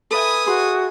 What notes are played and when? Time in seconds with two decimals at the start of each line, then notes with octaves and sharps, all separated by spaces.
0.11 A4 B4 E5 G#5 D#6
0.46 F#4 G#4 C6